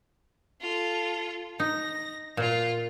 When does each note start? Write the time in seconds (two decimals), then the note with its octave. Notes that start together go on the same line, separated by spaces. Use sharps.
0.61 F4 A4
1.60 D#4 A#6
2.37 A#2 F4 F5